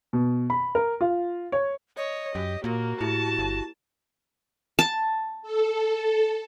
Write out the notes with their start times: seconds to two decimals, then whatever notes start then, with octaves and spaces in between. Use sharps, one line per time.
0.13 B2
0.50 B5
0.75 A#4
1.01 F4
1.52 C#5
1.97 C#5 D#5
2.35 F#2 G4
2.64 A#2 A#3 F#4
3.01 A2 E4 G4 A5
3.39 G1
4.79 A5
5.42 A4